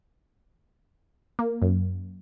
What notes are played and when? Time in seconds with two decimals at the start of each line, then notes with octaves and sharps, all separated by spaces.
1.39 A#3
1.62 F#2